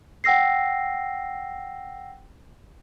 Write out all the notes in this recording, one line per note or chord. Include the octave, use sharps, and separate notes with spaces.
F#5 G5 E6 A#6 C7